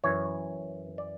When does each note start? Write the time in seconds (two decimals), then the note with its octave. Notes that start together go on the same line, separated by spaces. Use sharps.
0.04 F#2 E3 C#5
0.98 D5